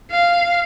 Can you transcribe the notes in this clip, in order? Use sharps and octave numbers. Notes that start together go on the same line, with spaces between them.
F5